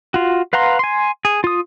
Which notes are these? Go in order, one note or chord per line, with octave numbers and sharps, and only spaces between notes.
F4 F#4
B4 F5 F#5 A#5 C6
G#5 C6
G#4
F4 D#6